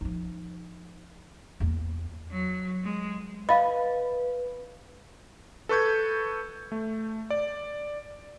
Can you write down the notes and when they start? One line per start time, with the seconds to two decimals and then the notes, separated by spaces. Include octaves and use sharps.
0.01 F3 D#4
1.60 E2 A#3
2.32 F#3
2.84 G#3
3.49 B4 D#5 F5 B5
5.69 A4 B4 C#6 G6 G#6
6.72 A3
7.30 D5